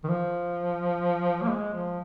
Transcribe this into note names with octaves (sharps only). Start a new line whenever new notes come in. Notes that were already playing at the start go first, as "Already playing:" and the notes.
D#3
F3
A#3
G#3
F3